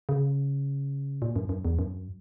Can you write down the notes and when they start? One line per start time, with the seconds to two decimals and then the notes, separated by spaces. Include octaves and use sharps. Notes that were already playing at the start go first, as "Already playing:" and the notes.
0.09 C#3
1.22 A#2
1.36 F#2
1.49 F#2
1.65 E2
1.79 F#2